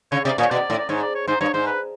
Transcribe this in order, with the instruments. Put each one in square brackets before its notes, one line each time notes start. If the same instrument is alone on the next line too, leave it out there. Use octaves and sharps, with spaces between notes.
[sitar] C#3 [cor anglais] C#5
[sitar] C3 [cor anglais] D5
[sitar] A#2 [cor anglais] C#5
[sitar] B2 [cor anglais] D5
[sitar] A2
[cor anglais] D5
[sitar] G#2 [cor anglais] C#5
[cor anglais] D5
C#5
[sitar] G#2 [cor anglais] C5
[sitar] G2 [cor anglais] C#5
[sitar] G#2 [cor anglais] C5
[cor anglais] B4